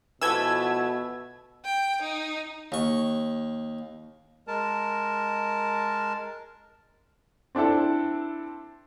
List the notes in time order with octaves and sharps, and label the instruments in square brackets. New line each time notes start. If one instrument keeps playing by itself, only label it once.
[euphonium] B2 [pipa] E3 F3 A4 [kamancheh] A3 B3 [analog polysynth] E6 G#6
[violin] G5
D#4
[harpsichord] D#2 C#6
[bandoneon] G#3 A#4 A5
[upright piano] C4 D4 E4 A4